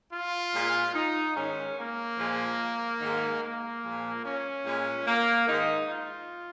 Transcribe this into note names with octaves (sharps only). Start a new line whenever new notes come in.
F4
A#2 G#3
D#4
G#2 D#3 G#3 C#4
A#3
A#2 F3 G#3
G#2 D#3 G#3
A#3
A#2 F3 G#3
C#4
A#2 G#3
A#3
G#2 D#3 G#3 D#4
F4